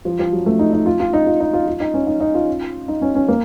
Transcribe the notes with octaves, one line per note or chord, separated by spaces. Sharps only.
F3
F3
F#3
A3
D#4
D#4
F4
F4
D#4
F4
D#4
F4
F4
D#4
C#4
D#4
D#4
F4
D#4
C#4
C#4
A#3